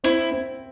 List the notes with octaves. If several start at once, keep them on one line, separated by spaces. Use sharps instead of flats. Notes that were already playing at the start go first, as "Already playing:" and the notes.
C4 E4
C4